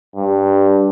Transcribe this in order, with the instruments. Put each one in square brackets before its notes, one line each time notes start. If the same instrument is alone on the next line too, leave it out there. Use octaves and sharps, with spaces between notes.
[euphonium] G2